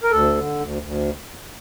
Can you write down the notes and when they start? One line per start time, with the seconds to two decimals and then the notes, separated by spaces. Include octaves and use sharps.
0.03 A#4
0.11 D2 A4
0.35 D3
0.59 D2
0.82 D2